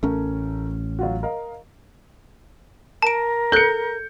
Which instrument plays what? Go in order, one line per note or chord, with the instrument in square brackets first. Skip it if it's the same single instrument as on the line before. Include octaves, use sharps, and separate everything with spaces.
[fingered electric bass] A1 C#4 [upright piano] A3 A#4
[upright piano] F#3 F4 F#4
A#4 D#5 F5
[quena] A#4 [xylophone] A5 D7
[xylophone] A4 F#6 [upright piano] G6 C#7